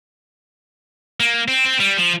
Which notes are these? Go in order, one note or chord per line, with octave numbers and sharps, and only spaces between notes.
A#3
C4
C4
G3
F3